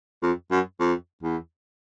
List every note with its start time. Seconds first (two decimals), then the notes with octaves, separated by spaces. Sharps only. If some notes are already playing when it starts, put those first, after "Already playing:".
0.23 F2
0.51 F#2
0.80 F2
1.23 E2